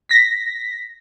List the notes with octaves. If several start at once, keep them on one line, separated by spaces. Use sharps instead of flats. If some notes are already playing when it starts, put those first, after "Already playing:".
A#6 B6